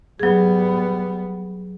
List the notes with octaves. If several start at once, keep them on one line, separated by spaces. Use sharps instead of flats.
F#3 G3 B3 G#4